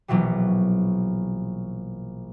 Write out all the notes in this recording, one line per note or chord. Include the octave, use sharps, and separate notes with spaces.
A#1 B2 E3 F#3 G3